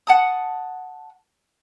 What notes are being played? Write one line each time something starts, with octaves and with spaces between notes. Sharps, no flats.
F#5 A5 D#6